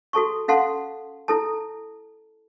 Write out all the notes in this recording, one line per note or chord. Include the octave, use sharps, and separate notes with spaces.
F#4 A4 A5 C#6
C#4 A4 F5 F#5 A5 C6
E4 A4 A5